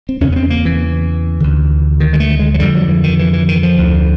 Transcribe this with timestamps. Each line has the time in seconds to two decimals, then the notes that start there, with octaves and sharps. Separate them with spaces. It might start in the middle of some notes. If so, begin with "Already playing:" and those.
0.09 C4
0.21 E2 C#3 C#4
0.32 B3
0.36 C4
0.50 A#3
0.65 E3
1.40 D2 D3
2.00 D#3
2.13 G#3
2.20 A3
2.39 G#3
2.54 F#3
2.59 F2 D3 G3
2.74 F#3
2.89 E3
3.04 D#3
3.19 E3
3.33 E3
3.48 D#3
3.63 F3
3.78 D2
3.83 D3